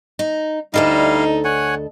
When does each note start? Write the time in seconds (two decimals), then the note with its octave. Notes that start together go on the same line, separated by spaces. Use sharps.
0.19 D#4
0.74 D2 G3 D#4 E4 A4 D#5 F5
1.44 C#5 F#5 G#5